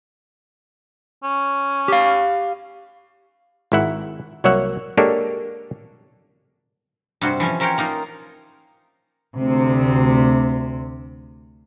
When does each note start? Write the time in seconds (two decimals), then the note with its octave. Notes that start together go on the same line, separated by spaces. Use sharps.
1.23 C#4
1.88 G4 F5
3.72 G#1 G#2 E4 E5 F#5
4.44 C2 F#3 A#3 C#5 E5 F#5
4.97 G#3 A#3 D4 G4 A4 C#5
7.21 G2 C3 F#4 C5
7.40 E3 F3 C#4
7.60 C#4 A#4 C5 C#5 G5
7.78 A#3 D#4 F4
9.37 D2 C3